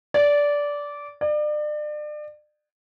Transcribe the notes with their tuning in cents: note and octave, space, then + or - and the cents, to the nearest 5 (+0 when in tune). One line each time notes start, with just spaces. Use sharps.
D5 -15
D5 +35